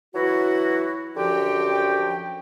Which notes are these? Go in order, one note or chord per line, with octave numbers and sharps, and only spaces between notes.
E3 F#3 E4 F#4
F#2 D3 F3 F#4 G4 G5